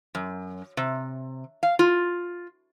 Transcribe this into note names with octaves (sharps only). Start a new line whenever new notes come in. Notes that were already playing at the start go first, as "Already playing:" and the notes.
F#2
C3
F5
F4